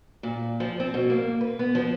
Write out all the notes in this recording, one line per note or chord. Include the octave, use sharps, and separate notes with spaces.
A#2
F3
C4
B2
A#3
B4
B3
F3